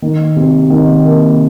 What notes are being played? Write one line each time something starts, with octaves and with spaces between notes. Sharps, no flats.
D#3
C3
D#3
A#3